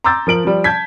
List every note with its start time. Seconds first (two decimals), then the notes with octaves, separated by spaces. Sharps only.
0.04 A#5 C6 D6 E6 G6 A6
0.27 F3 A#4 D7 F#7
0.45 F3 G3
0.64 A5 G6 G#6 B6